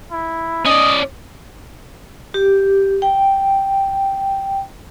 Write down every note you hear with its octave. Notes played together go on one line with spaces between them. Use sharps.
E4
C#4 D5 D#5
G4
G5